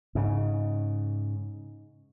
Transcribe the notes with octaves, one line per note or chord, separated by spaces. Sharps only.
G#2 C#3